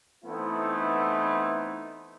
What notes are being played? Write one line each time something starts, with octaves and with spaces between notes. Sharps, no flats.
E3 A3 B3 C4 D#4 E4